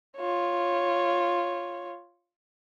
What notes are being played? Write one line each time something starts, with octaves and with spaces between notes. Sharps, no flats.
F4 C#5